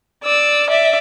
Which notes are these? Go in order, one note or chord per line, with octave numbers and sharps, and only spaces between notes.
D5 E6
D5 E5